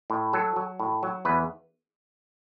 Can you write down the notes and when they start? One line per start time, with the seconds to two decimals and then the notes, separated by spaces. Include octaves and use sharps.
0.10 A2
0.33 F#3 A4
0.56 F#3
0.80 A2
1.03 F#3
1.25 E2 B4